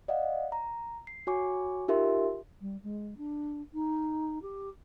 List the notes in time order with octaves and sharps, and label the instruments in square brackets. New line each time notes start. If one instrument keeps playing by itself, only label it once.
[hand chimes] D5 D#5 F5 F#5
A#5
C7
F#4 C#5 G#5 C#6 D6
D#4 F4 G4 A#4 E5 C6
[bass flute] G3
G#3
D4
D#4
G4